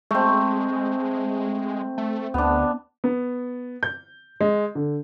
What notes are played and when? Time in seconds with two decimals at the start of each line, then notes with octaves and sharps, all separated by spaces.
0.11 G#3 A3 C4
1.98 A3
2.34 D2 B3 D4
3.04 B3
3.83 G6
4.41 G#3
4.75 D3